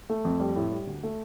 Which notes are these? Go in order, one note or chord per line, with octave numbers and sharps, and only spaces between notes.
A3
F2
G3
A2
G3
D2
A3